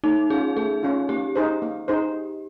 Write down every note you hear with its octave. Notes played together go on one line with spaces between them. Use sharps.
A3 D#4
C#4 F4 G#4
A3 G#4
C#4 F4
A#3 G4
D#4 G#4 C5
A#3
D#4 G#4 C5